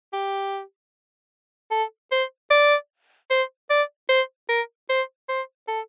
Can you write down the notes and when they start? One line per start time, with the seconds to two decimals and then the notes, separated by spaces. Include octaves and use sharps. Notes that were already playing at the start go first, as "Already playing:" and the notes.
0.13 G4
1.71 A4
2.12 C5
2.51 D5
3.30 C5
3.70 D5
4.09 C5
4.49 A#4
4.89 C5
5.29 C5
5.68 A4